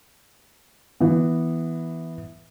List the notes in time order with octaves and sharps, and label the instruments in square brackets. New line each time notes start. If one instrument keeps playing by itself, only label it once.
[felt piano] E3 B3